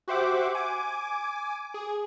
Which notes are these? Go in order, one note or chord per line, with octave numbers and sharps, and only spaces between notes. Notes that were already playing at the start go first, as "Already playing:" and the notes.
F#4 G4 C5 E5 F#5 D6
G#5 D6
G#4